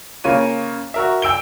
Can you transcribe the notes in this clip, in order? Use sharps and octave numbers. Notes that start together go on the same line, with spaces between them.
C#3 A#3 F4 C#5 D#7
F#4 A#4 E5
G5 E6 D7 G7